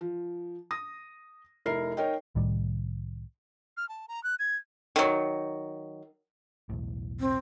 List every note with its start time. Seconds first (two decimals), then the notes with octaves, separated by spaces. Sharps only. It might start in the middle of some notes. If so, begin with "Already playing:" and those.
0.01 F3
0.71 D#6 A#6
1.66 F1 E4 A#4 C7
1.97 D#4 A#4 C#5 D#5 G5
2.35 C2 A2 D#3 G3
3.77 F6
3.89 A5
4.08 A#5
4.24 F#6
4.39 G#6
4.96 D#3 F#3
6.69 B1 E2 A2
7.20 C4